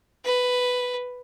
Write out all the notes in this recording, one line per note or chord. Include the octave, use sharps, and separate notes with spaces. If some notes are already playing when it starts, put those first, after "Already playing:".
B4